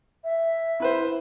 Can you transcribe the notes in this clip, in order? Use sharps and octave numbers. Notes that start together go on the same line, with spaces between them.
E5
E4 B4 C5